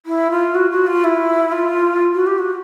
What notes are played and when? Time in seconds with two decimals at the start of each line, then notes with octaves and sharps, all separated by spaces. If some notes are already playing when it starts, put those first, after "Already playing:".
0.06 E4
0.31 F4
0.54 F#4
0.71 F#4
0.87 F4
1.04 E4
1.52 F4
2.14 F#4
2.26 G4
2.38 F#4